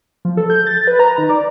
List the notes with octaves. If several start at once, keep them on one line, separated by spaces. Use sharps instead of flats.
F3
A4
G6
A6
B4
A#5
D#3
D5